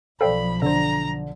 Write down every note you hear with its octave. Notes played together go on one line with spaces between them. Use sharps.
B1 F3 A4 C5 D5 F5 G5 B5
D3 A4 C5 A#5